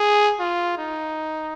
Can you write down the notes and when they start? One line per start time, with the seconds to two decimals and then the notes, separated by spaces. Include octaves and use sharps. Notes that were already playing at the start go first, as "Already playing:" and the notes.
Already playing: G#4
0.40 F4
0.78 D#4